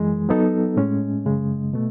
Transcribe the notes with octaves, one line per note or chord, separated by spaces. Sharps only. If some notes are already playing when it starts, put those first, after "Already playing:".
Already playing: F#2 E3 G#3
F#3 B3 D#4 A4
A2 G#3 C#4
F#2 C#3 G#3
B2 A3